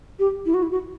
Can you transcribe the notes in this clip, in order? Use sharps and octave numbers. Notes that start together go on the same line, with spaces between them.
G4
E4
F#4
E4
F#4